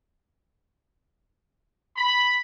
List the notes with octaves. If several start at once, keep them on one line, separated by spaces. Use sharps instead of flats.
B5